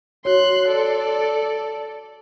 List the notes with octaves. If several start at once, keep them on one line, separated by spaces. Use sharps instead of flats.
F#4 C#5 C6 F#6
A4 D5